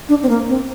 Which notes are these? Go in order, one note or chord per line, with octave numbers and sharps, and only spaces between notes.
D4
C4
A#3
C4